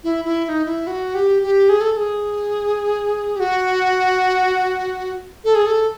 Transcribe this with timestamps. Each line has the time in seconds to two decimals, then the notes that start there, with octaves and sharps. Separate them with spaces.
0.04 E4
0.25 E4
0.45 E4
0.49 D#4
0.66 E4
0.87 F#4
1.15 G4
1.42 G4
1.69 G#4
1.81 A4
1.92 A4
1.97 G#4
3.36 G4
3.40 F#4
5.45 A4
5.55 G#4
5.66 A4